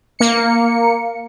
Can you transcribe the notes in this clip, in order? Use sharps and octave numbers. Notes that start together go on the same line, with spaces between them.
A#3 C#7